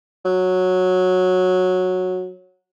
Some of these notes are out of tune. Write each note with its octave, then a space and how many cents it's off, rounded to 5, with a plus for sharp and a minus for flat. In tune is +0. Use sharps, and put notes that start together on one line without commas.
F#3 -10